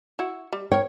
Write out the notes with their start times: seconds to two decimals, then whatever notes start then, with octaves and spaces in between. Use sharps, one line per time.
0.19 E4 F#4
0.53 G3
0.72 A#4 C#5 G5